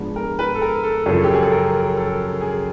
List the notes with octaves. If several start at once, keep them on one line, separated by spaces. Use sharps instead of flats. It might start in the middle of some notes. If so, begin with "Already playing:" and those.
Already playing: G#2 F3 G#3 B3 D4
A#4
B4
A4
A#4
A4
F#2 C#3 F3 A4
G4
G#4
A4
A#4
A4
G#4